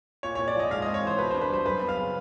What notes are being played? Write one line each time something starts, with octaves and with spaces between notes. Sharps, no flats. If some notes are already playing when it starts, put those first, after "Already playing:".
A#2 C#5
C#5
A#2
D5
F3 D#5
G#2 F5
D#5
C4
C#5
E3 C5
B2 B4
C5
D4
B4
G3 C5
F#2 B4
B3
F5
C#3